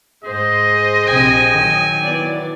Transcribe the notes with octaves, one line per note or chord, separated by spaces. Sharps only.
G#2 G#4 C5 D#5
A#1 C3 G5 G#5
D#3 F#3
E3 B3 D5